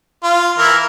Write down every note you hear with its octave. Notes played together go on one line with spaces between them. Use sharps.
F4
E3 E4 A#4